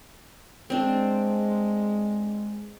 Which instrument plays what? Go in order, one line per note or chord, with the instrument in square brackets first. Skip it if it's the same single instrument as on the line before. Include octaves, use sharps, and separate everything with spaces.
[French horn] G#3 [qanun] C4 D4